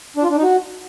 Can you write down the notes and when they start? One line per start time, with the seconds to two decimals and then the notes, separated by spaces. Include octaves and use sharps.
0.17 D4
0.23 F4
0.30 D4
0.37 D#4
0.43 F#4